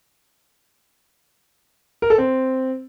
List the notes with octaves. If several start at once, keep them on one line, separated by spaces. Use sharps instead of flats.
A#4
A4
C4